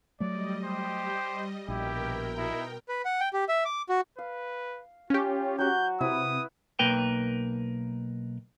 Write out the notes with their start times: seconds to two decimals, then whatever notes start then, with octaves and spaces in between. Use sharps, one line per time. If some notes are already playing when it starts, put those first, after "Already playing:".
0.20 F#3 G3 A3 D5 D#5
0.63 G4 C5
1.68 A#1 B2 E4 G4 A#4 G5
2.38 D#4 E4
2.89 B4
3.05 F#5
3.20 G5
3.33 G4
3.49 E5
3.65 D6
3.89 F#4
4.18 B4 F5
5.10 C#4 F4 G4
5.59 F#3 F#4 G6
6.01 C3 E4 B4 D#6
6.79 B1 A#3 A#4 B4 G5